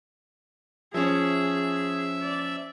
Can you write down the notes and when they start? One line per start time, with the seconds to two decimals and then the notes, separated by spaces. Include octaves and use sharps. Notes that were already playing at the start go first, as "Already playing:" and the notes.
0.94 F3 C#4 G#4 E5
2.23 D5